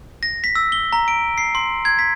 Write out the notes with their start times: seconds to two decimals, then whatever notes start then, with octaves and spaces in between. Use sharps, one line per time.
0.23 A#6
0.44 B6
0.55 E6
0.72 G7
0.93 A#5
1.08 D7
1.38 C7
1.55 C6
1.85 G#6
1.99 B6